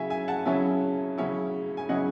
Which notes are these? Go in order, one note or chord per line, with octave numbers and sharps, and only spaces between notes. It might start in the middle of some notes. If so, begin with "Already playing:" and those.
Already playing: C#3 F#3 C#4 E4 E5 G#5
E5 G#5
F#5 A5
C#3 F#3 C#4 E4 E5 G#5
C#3 F#3 C#4 E4
G#5
C#3 F#3 C#4 E4 D#5 F#5